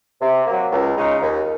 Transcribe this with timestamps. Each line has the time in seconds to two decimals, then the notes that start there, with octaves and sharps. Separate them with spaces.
0.21 C3
0.47 F#3 A#3
0.72 C#2
0.96 C#3 G#3 D#4
1.21 D#2